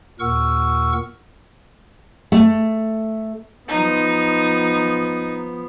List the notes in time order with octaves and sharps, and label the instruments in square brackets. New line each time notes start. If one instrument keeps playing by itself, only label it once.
[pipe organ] D#2 A#2 A#4 F#5 C#6 E6
[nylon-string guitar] A3
[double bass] F3 B3 [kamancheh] D#4